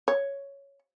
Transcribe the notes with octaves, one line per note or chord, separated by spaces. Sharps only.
C#5